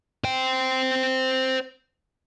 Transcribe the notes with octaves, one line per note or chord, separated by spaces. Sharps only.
C5 G5